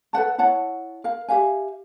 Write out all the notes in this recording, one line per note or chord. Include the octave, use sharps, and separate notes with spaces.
A4 B4 F#5 A5
E4 C#5 F#5 A5
A#4 F5
G4 E5 F5 G#5